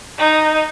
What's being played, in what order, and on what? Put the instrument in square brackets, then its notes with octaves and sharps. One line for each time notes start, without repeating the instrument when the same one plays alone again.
[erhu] D#4